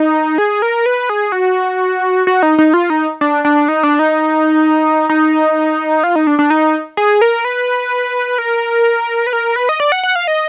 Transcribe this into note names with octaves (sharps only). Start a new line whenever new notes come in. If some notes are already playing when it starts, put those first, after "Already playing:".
Already playing: D#4
G#4
A#4
B4
G#4
F#4
F#4
D#4
D#4
F4
D#4
D4
D4
D#4
D4
D#4
D#4
F4
D#4
D4
D4
D#4
G#4
A#4
B4
A#4
B4
A#4
B4
D#5
D5
F#5
F#5
F5
D#5